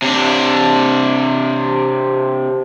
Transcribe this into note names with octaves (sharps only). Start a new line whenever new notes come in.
C3 D4